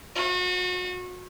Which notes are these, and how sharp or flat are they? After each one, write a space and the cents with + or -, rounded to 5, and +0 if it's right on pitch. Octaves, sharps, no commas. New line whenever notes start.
F#4 -35